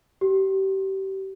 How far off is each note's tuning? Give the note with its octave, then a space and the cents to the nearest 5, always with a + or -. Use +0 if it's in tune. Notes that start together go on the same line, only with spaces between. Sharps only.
G4 -30